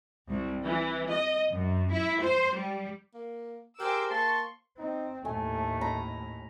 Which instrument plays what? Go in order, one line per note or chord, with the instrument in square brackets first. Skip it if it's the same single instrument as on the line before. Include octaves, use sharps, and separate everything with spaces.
[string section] C2
E3
D#5
F#2
E4
C5
G3
[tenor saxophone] A#3
[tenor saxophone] G4 [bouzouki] G#4 G#5 [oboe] A#4 [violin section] C5 D6 E6
[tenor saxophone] A#3 [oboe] A5 [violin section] C6 C#6
[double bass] C4 [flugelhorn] D#4
[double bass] D#2 A2 [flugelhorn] A3 [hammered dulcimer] G#5
[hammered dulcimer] A#5 B5